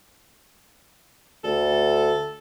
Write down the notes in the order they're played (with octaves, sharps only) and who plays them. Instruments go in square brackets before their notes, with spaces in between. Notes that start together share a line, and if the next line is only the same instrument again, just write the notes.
[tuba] D2 [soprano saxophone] A4